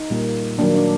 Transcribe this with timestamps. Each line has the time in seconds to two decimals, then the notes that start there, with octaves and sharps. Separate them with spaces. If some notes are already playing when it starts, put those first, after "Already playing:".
Already playing: D#4
0.10 A#2 G3 A#3
0.59 D#3 F#3 A#3 D4
0.75 D4